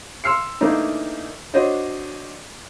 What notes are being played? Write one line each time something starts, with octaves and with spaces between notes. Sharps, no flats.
C6 E6 F6 C7 C#7
E3 A3 A#3 D4 D#4
D4 F#4 C5 C#5 D#5